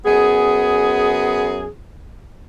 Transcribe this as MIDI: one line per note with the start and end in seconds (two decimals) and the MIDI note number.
0.05 1.68 42
0.05 1.68 59
0.05 1.68 68